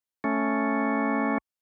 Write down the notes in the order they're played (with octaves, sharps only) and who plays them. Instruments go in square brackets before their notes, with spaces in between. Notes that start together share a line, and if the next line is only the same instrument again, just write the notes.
[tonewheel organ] A3 C#4